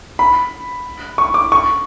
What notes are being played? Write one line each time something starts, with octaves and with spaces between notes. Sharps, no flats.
B5
C#6
D6
C#6